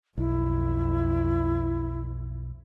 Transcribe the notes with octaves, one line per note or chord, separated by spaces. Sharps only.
B1 F2 E4